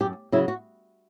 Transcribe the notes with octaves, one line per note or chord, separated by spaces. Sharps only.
F#2 G4
C#3 F#3 E4
F#4